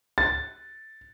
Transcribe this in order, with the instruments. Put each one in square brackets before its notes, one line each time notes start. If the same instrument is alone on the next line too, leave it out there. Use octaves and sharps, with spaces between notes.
[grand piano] A6